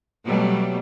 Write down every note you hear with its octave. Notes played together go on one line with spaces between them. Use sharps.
B2 F#3 G3 A3